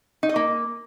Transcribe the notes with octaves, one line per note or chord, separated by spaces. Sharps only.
D#4
D#5
A#3